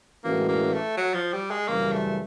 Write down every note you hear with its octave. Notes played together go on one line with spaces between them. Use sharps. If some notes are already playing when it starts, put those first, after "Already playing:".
A2 E3 G#3 A#3 C#4 F#4
A#3
A3
F#3
F3
G3
G#3
F#2 C#3 E3 G3 A#3
A3